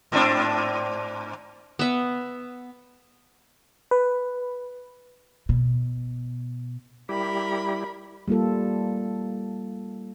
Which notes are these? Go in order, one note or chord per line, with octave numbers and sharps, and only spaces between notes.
G#2 C4 D4
B3 E5
B4
B2
G3 E4 G4 A#4 B5
G3 A#3 F4 A4